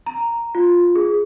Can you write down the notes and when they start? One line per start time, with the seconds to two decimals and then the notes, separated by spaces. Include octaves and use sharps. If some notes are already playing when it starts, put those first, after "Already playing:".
0.06 A#5
0.55 F4
0.95 G#4